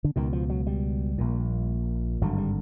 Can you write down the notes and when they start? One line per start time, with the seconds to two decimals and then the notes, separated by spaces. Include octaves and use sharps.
0.04 D3
0.16 C#2 B2 D#3
0.33 F3
0.50 F#3
0.67 G3
1.18 A#1 A#2
2.21 G#1 G2 D3 F#3
2.38 G3